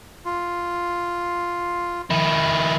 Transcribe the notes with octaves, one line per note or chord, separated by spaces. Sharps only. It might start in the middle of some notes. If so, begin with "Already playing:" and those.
F4
D#3 E4